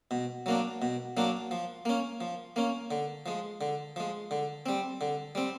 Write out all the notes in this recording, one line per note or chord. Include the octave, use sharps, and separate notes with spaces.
B2
F#3 A#3 D4
B2
F#3 A#3 D4
F3
A#3 C#4
F3
A#3 C#4
D3
F3 G#3
D3
F3 G#3
D3
G3 C4
D3
G3 C4